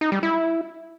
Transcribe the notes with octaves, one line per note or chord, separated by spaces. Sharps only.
D#4
G3
E4